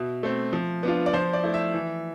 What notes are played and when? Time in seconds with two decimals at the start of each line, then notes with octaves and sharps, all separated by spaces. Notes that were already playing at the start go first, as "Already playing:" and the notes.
Already playing: B2 E5
0.23 A3 C4
0.53 F3
0.83 B3 D4 F4
1.06 D5
1.13 F3 C5
1.33 D5
1.43 A3 E4
1.54 E5
1.74 E3